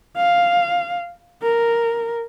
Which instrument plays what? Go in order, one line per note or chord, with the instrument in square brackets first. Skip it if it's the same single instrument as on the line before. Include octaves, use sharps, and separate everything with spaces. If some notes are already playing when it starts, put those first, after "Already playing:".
[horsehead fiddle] F5
A#4